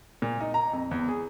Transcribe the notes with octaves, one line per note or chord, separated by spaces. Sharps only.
A#2
D#4
A#5
F2
E2
G#4